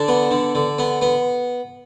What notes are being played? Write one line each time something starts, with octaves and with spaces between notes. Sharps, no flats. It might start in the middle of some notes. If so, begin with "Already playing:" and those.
Already playing: D3 D4
B3
D3
D3
B3
B3